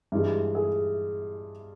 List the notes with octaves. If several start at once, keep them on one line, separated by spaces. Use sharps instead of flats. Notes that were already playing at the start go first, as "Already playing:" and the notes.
G2 E3 G#3
G#4